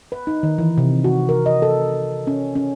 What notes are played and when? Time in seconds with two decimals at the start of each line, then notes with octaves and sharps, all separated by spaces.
0.12 B4
0.27 D#4
0.43 D#3
0.58 E3
0.78 C3
1.04 F#4
1.29 A#4
1.46 D#5
1.62 A4
2.27 C#4
2.55 C#4